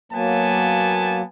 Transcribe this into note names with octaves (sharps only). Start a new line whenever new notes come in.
F#3 A#3 B3 G#5 A5